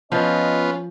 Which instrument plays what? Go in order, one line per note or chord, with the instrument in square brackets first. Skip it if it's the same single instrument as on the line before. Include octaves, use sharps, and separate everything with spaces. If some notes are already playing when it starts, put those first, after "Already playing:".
[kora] F3 [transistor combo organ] B3 F4 [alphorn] C#4 [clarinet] D#5